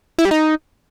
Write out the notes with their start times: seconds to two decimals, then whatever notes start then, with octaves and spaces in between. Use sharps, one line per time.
0.18 E4
0.25 G3
0.31 D#4